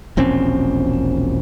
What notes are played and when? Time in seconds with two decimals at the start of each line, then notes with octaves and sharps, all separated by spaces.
0.17 E1 A#1 C4 C#4